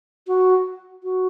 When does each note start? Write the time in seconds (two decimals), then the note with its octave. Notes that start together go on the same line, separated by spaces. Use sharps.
0.27 F#4
1.04 F#4